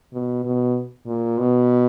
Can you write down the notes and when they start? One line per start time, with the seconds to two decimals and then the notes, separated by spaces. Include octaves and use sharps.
0.13 B2
0.45 B2
1.06 A#2
1.38 B2